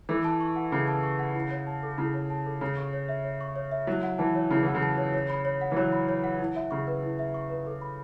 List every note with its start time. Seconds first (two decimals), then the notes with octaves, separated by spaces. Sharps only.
0.09 E3 A4
0.24 A5
0.41 C#6
0.56 F#5
0.72 C#3 A4
0.88 A5
1.03 C#6
1.19 F#5
1.35 E4
1.51 C#5
1.67 A5
1.83 A4
1.98 C#3 E4
2.14 C#5
2.30 A5
2.46 A4
2.61 C#3 C#5
2.77 C#6
2.93 C#5
3.09 E5
3.24 C#5
3.41 C#6
3.56 C#5
3.72 E5
3.87 F#3 E4
4.03 F#5
4.18 E3 A5
4.35 C#5
4.51 C#3 E4
4.63 E3 F#5
4.75 C#3
4.83 A5
4.98 C#5
5.14 C#5
5.30 B5
5.45 C#5
5.61 F#5
5.72 E3
5.76 F#3 C#5
5.92 B5
6.09 C#5
6.24 F#5
6.39 E4
6.56 E5
6.71 C#3 C#6
6.87 B4
7.02 E4
7.19 E5
7.34 C#6
7.50 B4
7.66 A4
7.81 B5